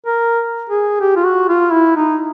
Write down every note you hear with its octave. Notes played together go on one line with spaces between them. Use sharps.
A#4
G#4
G4
F4
F#4
F4
E4
D#4